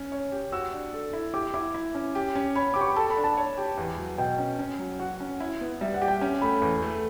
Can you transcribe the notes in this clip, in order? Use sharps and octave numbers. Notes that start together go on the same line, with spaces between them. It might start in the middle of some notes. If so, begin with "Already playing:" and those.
Already playing: C#4
C#5
G4
F#4 E6
D4
A4
E4
G4 D6
E4 D6
E4
C#4
G4
C#4
C#5 B5
G4 D6
C#6
B5
A4 A5
B5
D4
A5
C#5
G4
E2
F#3
B2 G5
C#4
C#4
F#3
F#4 F#5
C#4
E4
B3
G3 E5
F#5
G4
G5
C#4
A3 B5
E2
A3